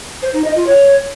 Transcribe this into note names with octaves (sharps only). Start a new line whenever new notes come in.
C5
D#4
D#5
F4
C#5